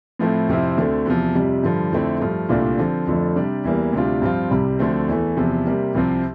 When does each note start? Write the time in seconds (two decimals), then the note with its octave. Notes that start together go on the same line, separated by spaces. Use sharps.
0.19 A2 F3 A3 C4 E4
0.48 F2 C3 F3 C4 E4
0.77 D2 D3 A3 C4
1.06 E2 C3 F3
1.34 F2 C3 G3
1.64 G2 D3 F3
1.92 F2 D3 A3 C4 E4
2.20 G2 F3 A3
2.49 C2 A#2 A3 D4 F4
2.78 D3 F3 C4
3.07 F2 D3 F3 A3
3.36 C3 G3 D4
3.64 E2 E3 G3 A#3
3.93 D2 C3 G3 D4 F4
4.22 G2 F3 C4 F4
4.50 C2 C3 G3
4.79 D2 D3 F3 A3 C4
5.08 E2 E3 A3
5.37 E2 C3 F3
5.66 C3 G3 A#3
5.95 C2 C3 F3 C4